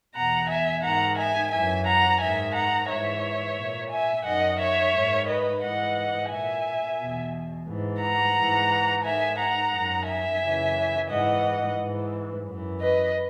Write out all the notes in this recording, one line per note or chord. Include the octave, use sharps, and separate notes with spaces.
E2 B2 F#5 A#5
E5 G#5
G#2 D#3 F#5 A#5
E5 G#5
F#2 E3 E5 G#5
F#5 A#5
G#2 D#3 E5 G#5
F#5 A#5
G#2 E3 C#5 E5
A#2
E5 G#5
F#2 D#3 D#5 F#5
C#5 E5
G#2 D#3
B4 D#5
G#2 E3 D#5 F#5
A#2 E5 G#5
E2 B2
G#2 E3
F#5 A#5
G#2 E3
G#2 D#3 E5 G#5
F#5 A#5
F#2 D#3
E5 G#5
F#2 C#3 E3
G#2 E3 D#5 F#5
G#2 E3
F#2 E3
B4 D#5